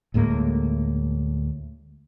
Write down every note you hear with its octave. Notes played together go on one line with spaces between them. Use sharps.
D2 A2 G#3 A#3